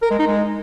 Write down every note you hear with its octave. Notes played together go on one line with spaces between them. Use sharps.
A#4
G#3
D#4
G#3